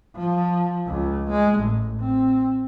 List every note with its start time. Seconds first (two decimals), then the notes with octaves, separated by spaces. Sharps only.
0.15 F3
0.87 C#2
1.30 G#3
1.59 A1
2.00 C4